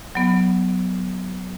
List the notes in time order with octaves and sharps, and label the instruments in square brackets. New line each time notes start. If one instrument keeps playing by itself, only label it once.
[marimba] F#3 B3